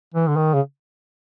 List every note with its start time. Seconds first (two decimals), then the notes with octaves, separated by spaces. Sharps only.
0.14 E3
0.28 D3
0.37 D#3
0.54 C#3